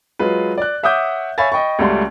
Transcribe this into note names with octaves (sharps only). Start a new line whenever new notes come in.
F#3 G#3 F4 B4
D5 F#6
C#5 E5 F#5 D6 D#6 G6
C#5 E5 F5 G#5 B5 A6
D#5 G5 B5 C#6
C#2 G3 A3 F#4 D5 C6